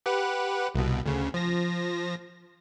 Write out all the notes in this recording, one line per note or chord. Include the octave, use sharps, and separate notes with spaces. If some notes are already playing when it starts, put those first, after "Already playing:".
G4 B4 F#5
C2 B2
D2 C#3
F3 A#6